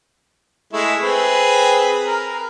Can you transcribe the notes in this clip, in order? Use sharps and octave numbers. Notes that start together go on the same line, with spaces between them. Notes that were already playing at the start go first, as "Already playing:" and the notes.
G#3 A3 E4
C4 G#4 B4
A#4